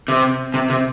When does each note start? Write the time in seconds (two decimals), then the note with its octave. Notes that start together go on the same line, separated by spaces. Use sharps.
0.08 C3
0.54 C3
0.70 C3